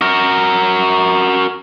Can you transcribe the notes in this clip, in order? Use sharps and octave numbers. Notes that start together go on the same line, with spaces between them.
F#4 A#4